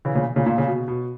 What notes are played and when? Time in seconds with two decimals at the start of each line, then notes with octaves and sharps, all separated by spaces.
0.05 C#3 E3
0.15 A#2 C#3
0.36 A#2 C#3
0.46 A#2
0.58 C#3
0.68 B2
0.88 B2